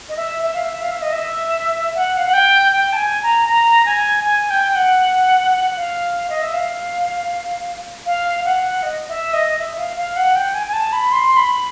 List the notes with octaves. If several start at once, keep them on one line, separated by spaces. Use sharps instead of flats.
D#5
E5
E5
F5
E5
F5
E5
D#5
E5
F#5
F5
F#5
G5
G5
A5
G#5
A#5
A#5
G#5
G#5
G5
F#5
F5
D#5
E5
F5
F5
F#5
D#5
E5
D#5
E5
F5
F5
F#5
G5
G#5
G#5
A5
B5
C6
C6
B5